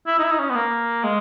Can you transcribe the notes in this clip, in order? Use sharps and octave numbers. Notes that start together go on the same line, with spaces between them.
E4
D#4
E4
D#4
C#4
B3
A#3
G#3